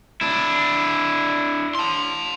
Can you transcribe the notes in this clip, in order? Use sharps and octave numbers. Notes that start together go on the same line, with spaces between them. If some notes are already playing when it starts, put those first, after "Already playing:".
D4 E4
A5 C6